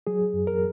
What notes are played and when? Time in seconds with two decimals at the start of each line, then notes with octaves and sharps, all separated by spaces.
0.07 F#3 G#4
0.33 F#2
0.47 A#4